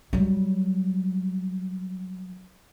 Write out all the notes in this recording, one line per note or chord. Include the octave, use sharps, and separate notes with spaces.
F#3 G3